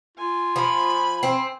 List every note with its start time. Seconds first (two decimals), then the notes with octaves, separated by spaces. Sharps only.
0.17 F4 G#5
0.56 F3 B5
1.23 C4